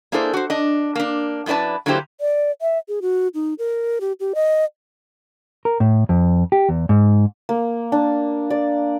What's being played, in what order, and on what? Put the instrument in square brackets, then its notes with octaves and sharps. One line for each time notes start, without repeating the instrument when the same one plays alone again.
[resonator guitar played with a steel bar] A#3 D4 E4 G#4 A4 C5
F#4 C5
D4 D#5
A#3 D4
F#2 D4 E4 B4 D5 A5
D3 F#3 A#3 E4 G4 C5
[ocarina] D5
E5
G#4
F#4
D#4
A#4
G4
G4
D#5
[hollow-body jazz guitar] A#4
A2
F2
G4
E2
G#2
[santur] A#3
D4
D5